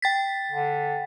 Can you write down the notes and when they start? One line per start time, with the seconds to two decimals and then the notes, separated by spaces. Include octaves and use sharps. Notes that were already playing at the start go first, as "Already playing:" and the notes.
0.02 G5 A6 B6
0.52 D3